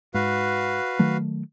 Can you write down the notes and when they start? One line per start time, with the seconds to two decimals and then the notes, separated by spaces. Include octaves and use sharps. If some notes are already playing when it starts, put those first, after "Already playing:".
0.14 G#2 F#4 B4 F5
0.99 D#3 F#3 A3